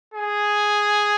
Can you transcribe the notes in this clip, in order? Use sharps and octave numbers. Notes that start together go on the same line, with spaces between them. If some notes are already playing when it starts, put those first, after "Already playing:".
G#4